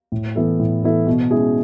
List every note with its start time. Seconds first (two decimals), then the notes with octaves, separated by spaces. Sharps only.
0.12 A2
0.35 E3 B3 E4 A4
0.59 A2
0.83 E3 B3 E4 A4
1.07 B2
1.31 G#3 C#4 E4 G#4